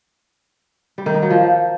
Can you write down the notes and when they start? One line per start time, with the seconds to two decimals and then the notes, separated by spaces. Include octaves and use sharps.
0.98 G3
1.06 D#3
1.14 D#4
1.22 F#3
1.30 F3